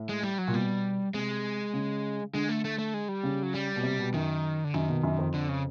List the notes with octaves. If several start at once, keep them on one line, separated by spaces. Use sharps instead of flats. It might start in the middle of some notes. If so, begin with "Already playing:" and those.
Already playing: A2
G#3
G3
F#3
A#2
B2 G3
C3 G#3
C#3
D3 G#3
A3
A3
A3
G#3
G3
C#3
F#3
G3
B2
C3
B2
F#2 D#3
D3
F#2 D#3
B2
F#2
F2
D3
C#3